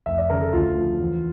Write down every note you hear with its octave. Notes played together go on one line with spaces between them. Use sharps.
F1 E5
D5
C#3 A#4
A4
D2 F4
F3
E2